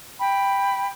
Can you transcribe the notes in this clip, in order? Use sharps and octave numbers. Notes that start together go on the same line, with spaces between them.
G5 B5